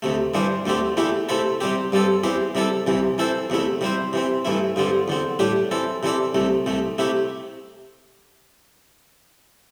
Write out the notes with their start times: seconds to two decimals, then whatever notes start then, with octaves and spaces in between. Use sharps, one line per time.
0.02 D2 C3 A3
0.34 G2 E3 G3 D4 C5
0.66 D2 D3 A3 C4 G4
0.97 E2 E3 A3 E4 G4
1.29 C3 A3 C4 E4 A4
1.61 C3 G3 C4 G4
1.92 G2 G3 C4 A4
2.24 E2 E3 C4 G4 C5
2.55 C3 G3 E4 A4
2.87 C2 C3 E3
3.18 E3 C4 E4 A4 C5
3.50 E2 C3 A3 E4
3.81 C3 G3 E4 C5
4.13 C3 E3 C4
4.45 G2 E3 A3 E4
4.76 G2 D3 G3 C4
5.08 E2 D3 C4
5.39 A2 G3 D4 G4
5.71 E3 C4 A4
6.03 C3 E3 C4 A4 D5
6.34 C2 C3 A3
6.66 C2 C3 A3
6.98 C3 A3 E4 G4